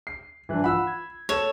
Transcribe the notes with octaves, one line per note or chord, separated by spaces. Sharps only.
C7
G2 E3 F3 D4 F#6
E3 F4 F#5 B5 E6
G#6
A4 C#5 E7